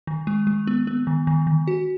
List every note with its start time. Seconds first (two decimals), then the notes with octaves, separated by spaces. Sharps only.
0.07 D#3
0.27 G#3
0.47 G#3
0.67 B3
0.87 B3
1.07 D#3
1.27 D#3
1.47 D#3
1.68 F#4